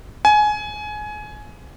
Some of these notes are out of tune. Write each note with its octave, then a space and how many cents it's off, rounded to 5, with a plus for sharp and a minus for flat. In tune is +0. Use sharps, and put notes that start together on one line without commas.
G#5 +20